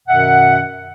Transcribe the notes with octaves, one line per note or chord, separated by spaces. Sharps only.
F#2 B2 D#3 E5 F#5